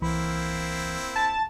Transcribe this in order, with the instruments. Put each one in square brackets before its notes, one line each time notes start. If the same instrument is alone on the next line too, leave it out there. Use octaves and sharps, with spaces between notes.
[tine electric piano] C2 E3 B5 [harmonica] A#3 C4 E4
[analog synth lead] A5